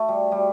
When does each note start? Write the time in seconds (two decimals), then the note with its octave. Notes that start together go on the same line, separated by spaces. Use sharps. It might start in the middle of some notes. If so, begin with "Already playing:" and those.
Already playing: A3
0.08 G3
0.32 G3